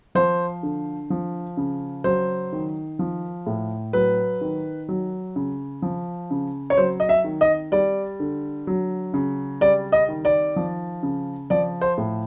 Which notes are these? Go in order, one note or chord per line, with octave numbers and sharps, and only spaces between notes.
F3 C5
D3
F3
C#3
F#3 C5
D#3
F3
A2
F#3 B4
D#3
F#3
C#3
F3
C#3
C#5
F#3 C5
D#5
E5
D#3
D#5
G3 D5
D3
F#3
C#3
G3 D5
D#5
D#3
D5
F3
C#3
F3 D5
C5
A2